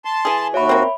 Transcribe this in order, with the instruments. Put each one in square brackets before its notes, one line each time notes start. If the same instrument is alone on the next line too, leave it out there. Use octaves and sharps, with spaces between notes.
[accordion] A5 C6
[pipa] E3 G#4
[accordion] D#2 F#4 [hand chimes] C#5 E5 B5
[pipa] A#3 C4